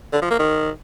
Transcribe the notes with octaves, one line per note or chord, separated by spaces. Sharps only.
D3
F3
A#3
D#3